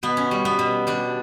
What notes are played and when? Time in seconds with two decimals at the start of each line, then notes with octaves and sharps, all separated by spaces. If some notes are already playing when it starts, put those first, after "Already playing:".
0.03 B2 B3
0.17 C#4
0.31 G3
0.45 B3
0.59 B2
0.87 G3 D4